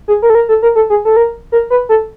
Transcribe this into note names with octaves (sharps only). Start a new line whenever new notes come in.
G#4
A#4
A4
A#4
A4
A#4
A4
G#4
A4
A#4
A#4
B4
A4